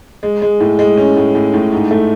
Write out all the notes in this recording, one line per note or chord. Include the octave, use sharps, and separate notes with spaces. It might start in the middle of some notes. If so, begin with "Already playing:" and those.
G#3
G#3
A2
G#3
C#4
A2
A2
A2
G#2
A3